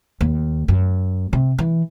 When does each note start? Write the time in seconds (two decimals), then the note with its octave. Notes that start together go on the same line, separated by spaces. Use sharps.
0.21 D#2
0.68 F#2
1.33 C3
1.58 E3